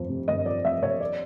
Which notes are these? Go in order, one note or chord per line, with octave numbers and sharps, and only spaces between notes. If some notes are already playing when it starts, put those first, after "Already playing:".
Already playing: G1 F2 F3
C3
G1 D#5
F3 D5
F2 E5
C3 C#5
D5